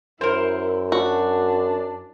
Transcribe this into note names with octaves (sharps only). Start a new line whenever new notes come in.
F#2 E4 A#4 C5
D4 F#4